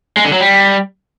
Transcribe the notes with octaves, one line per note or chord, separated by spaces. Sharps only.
G#3
D3
F#3
G3